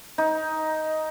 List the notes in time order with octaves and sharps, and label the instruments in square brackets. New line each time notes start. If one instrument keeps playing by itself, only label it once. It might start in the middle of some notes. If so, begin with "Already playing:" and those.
[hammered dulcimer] D#4